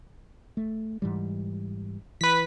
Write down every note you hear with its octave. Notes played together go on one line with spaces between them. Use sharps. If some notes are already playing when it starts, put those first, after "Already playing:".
A3
G#2 E3 G3
E3 B4 B6